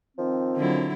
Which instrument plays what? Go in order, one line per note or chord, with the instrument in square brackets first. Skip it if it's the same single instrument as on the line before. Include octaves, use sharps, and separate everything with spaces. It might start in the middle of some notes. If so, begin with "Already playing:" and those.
[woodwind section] D#3 F3 C4
[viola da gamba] D3 F#3 E4